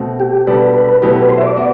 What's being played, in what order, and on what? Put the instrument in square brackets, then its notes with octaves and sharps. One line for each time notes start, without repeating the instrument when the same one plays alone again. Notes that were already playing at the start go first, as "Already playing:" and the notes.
Already playing: [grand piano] B2 A3 C4
[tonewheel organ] G4
[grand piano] B2 G3 D4 A4 D5 [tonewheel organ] B4
[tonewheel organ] B4
[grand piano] B2 F#3 A3 E4 G4 [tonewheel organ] B4
[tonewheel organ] B4
C5
E5
D5
[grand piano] B3 F#4